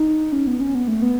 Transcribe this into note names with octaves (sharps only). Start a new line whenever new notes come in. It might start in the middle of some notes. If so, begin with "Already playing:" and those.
Already playing: D#4
C#4
B3
C#4
B3
A3
B3